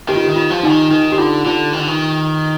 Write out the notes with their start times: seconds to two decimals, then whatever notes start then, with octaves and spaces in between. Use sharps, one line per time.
0.08 D#3 G4
0.16 F4
0.24 G4
0.29 D#3
0.36 F4
0.50 F3
0.63 D3 D#4
0.70 D#3
0.91 D#3 D#4
1.12 G4
1.18 D3 F4
1.45 D3 F4
1.73 D#3
1.79 D3
1.87 D#3